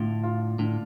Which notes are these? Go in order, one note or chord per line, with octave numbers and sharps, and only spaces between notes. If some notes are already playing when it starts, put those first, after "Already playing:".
Already playing: A2 D3 D4 F4
F4
A2 D3